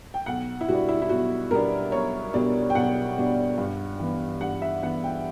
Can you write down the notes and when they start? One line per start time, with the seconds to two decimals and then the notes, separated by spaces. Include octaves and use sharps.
0.14 G5
0.26 B1 F#5
0.61 E4
0.68 B2 G3 B3 D4 F#4
0.89 E4
1.02 E4
1.09 B1 F#4
1.51 B2 G3 B3 D4 A#4
1.92 B1 C#5
2.34 B2 G3 B3 D4 D5
2.70 G5
2.75 B1 F#5
3.17 B2 G3 B3 D4
3.58 G2
4.00 E3 B3
4.41 G2 F#5
4.62 E5
4.82 E3 B3 F#5
5.04 G5